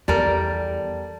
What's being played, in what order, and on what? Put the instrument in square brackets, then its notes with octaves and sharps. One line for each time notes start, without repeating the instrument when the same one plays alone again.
[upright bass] E2 [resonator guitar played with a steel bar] G3 A4 A#4